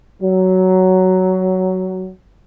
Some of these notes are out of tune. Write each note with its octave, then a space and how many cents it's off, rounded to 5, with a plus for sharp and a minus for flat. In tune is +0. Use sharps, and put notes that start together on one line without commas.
F#3 +10